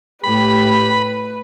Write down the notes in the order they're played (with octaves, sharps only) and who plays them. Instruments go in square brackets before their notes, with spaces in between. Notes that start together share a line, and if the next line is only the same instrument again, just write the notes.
[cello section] A2 [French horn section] G4 [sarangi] B4 [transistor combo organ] B5